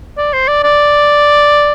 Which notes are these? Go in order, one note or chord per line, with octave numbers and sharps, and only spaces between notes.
D5
C5
D5
D5